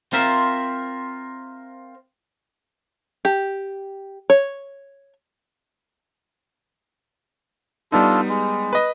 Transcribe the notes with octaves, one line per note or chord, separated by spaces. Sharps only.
C4 F4 A#4 E5
G4
C#5
G3 B3 D4 D#4 F4 A4
G#3
B4 D#5